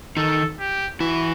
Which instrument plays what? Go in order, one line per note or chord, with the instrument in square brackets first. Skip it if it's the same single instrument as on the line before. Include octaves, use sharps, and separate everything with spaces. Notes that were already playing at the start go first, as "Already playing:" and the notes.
[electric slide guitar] D#3 D#4 [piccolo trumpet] A4
[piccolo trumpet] G4
[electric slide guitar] E3 E4 [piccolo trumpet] F#4